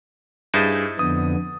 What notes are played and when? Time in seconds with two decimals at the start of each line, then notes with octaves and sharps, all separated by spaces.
0.54 G2 D#4 E4 G#4 C5 A6
0.99 F2 D3 B3 D#6